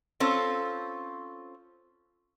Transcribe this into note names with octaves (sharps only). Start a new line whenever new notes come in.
C4 C#4 F4 A4 C5